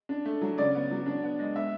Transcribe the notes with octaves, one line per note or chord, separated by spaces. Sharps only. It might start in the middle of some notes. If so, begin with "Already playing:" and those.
D4
A3
F#3
C#3 D5
B3
F#3
D4
B3
G#3
B3 E5